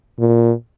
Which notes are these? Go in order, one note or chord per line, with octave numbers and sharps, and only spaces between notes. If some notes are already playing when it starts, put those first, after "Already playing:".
A#2